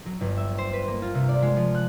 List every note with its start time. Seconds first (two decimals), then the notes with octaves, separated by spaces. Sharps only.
0.06 F#3
0.21 G1
0.37 E5
0.58 C5
0.73 B4
0.88 A#3
1.02 F4
1.15 C3
1.29 D5
1.42 G#3
1.57 F3
1.75 F#6